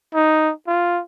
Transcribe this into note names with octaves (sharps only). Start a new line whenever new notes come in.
D#4
F4